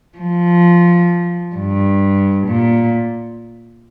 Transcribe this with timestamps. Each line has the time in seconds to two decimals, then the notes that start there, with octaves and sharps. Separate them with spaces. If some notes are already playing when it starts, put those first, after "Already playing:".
0.18 F3
1.55 G2
2.47 A#2